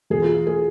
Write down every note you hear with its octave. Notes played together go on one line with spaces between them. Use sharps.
E2 B2 G#4
F4
G#4